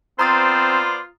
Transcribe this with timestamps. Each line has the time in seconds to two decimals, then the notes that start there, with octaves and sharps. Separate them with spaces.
0.19 B3 C4 F4 C5 D5 A#5 D#6 A6